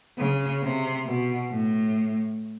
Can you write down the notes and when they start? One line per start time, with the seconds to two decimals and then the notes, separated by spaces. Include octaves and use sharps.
0.18 C#3
0.63 C3
1.06 B2
1.50 A2